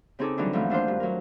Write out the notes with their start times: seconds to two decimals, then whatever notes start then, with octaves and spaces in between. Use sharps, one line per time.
0.19 C#3 C4 D#4 G#4 A4 D6
0.37 D3 E3 F#3 G3 D4 D#4
0.53 E2 G#2 E3 F3 A3
0.70 D#2 D4 F4 C5
0.88 G2
1.00 F#3 A3 A#4